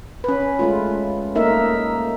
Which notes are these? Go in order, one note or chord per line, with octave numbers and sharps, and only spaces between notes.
C#4 B4
G#3 A3 F4
A3 A#3 D#4 A#4 E5